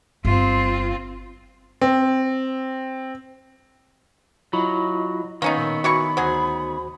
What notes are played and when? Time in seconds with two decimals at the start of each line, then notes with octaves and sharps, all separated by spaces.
0.25 G1 C4 F4
1.82 C4
4.53 F#3 E4 F4 D#5 B5
5.42 D#3 A#3 B3 C#4 D#4 B4 C#5
5.57 A#2 E6
5.84 E3 F#4 C#5 B5 C#6
6.17 D2 F#3 F#4 G#4 C5